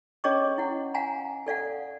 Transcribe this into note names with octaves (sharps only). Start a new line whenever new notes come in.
C#4 G#4 C#5 D#5 C#6 D6
E4 F#5
F5 F#5 G#5 A#5
A4 D5 F5 F#5